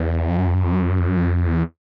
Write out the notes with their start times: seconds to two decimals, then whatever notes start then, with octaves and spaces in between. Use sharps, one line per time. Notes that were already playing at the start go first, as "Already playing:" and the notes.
Already playing: E2
0.28 F2
0.38 F#2
0.47 F2
0.54 F#2
0.64 F2
0.73 F#2
0.82 F2
0.90 F#2
0.99 F2
1.08 F#2
1.17 F2
1.47 E2